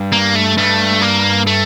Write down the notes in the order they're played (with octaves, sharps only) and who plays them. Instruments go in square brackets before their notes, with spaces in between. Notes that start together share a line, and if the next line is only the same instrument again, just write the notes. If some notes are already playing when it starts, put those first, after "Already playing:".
Already playing: [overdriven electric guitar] G2
[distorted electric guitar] A#3
A3
[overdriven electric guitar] G2 [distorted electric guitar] A3
[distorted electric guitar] A#3
A3